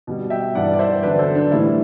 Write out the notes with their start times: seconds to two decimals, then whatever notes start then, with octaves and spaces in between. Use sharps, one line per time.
0.07 B2 G3
0.30 E5 G5
0.55 G2 E3 G3 D5 F#5
0.73 D5
0.79 C5 E5
1.03 E2 D3 F#3 B4 D5
1.19 A4 C5
1.35 D4
1.51 A2 E3 G3 E4